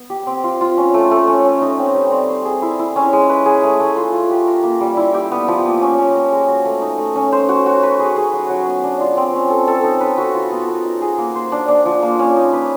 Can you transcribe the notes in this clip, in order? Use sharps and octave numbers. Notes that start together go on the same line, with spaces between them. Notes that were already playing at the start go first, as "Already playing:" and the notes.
Already playing: B3
G4
C4
F4
F4
C#4
A3
A3
C#4
C#4
D#4
C4
G3
C4
C5
G#4
E4
E4
C#4
G#3
B4
G#4
A3
A3
F4
F4
G4
A#4
A#3
G3
E4
G4
B3
F3
A#3
C#4
C#4
A#4
G#3
F#4
A3
D#4
A3
C#4
C5
F#4
F#4
B4
G#4
G#4
F#3
F#3
B3
D4
F4
C4
C#4
A4
A4
D#4
B4
F#4
F4
B3
A#4
D#4
G#4
A#3
C5
D4
D4
F3
A#3
C#4
D#4
B4